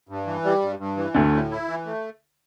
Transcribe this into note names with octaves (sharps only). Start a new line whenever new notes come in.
G2
E3
G3
G2
G2
E3
D2 D3 A3
A2
E4
E3
A3